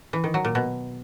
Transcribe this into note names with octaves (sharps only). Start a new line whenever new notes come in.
E3
D#3
F#3
A#2
B2